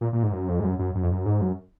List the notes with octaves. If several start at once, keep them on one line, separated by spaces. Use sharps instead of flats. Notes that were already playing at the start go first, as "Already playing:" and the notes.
A#2
A#2
G#2
F#2
F2
G#2
F#2
F#2
F#2
F2
F#2
G#2
F#2